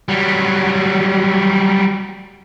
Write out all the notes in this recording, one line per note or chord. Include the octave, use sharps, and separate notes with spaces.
F#3 G3